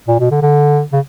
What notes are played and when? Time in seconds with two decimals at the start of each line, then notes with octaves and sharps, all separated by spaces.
0.08 A#2
0.19 B2
0.31 D3
0.42 D3
0.92 C#3